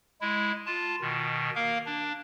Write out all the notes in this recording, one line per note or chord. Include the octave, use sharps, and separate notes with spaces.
G#3 E4
F4 A5
B2 D#3
A#3 A#4 F5
D4